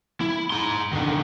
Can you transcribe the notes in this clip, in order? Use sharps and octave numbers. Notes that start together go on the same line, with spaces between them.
E4
D#4 C6
D3 D#3